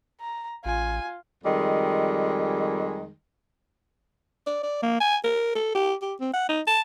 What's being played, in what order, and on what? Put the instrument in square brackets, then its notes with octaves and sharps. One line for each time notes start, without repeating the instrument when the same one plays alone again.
[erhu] A#5
[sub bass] A1 [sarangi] F4 [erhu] G#5
[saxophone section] F2 D#3 G3 G#3
[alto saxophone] D5
D5
A#3
G#5
A#4
A4
G4
G4
C4
F#5
D#4
A5